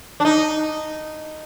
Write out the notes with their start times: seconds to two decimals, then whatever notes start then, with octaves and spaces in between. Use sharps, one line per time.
0.20 D4
0.25 D#4